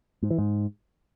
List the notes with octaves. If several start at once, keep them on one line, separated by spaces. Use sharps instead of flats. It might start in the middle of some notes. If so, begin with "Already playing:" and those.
G#2
E3
G#2